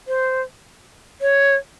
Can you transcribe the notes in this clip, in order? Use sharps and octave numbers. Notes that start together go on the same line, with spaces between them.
C5
C#5